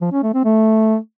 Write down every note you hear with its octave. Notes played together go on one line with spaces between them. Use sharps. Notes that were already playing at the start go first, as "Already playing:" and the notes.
F3
C#4
A3
C4
A3